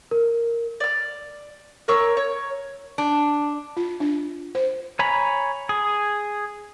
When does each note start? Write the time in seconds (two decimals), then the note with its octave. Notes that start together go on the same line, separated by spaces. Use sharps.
0.11 A#4
0.80 D5 F6
1.88 A#4 C#5 C#6 E6
2.17 C#5
2.98 D4
3.77 F4
4.00 D4
4.55 C5
4.99 C#5 G#5 A#5 B5
5.69 G#4